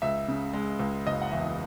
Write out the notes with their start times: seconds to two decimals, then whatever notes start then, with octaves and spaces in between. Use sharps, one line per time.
0.02 C#2 E5
0.28 C#3
0.53 G#3
0.79 C#2
1.06 F#1 D#5
1.22 F#5
1.31 E2 E5